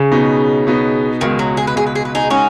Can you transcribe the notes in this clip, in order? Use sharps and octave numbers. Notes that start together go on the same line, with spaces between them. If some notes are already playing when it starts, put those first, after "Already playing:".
Already playing: C#3
B2 B3 D#4
B2 B3 D#4
C#2 B2 D#3 G#3
F#3
G#4
B4
C#2 B2 G#3 G#4
B4
G#4
B4
D#4 G#4
G#3 C#4 D#4 F#4